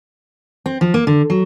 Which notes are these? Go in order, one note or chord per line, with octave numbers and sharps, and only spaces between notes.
C4
F3
A#3
D3
F#3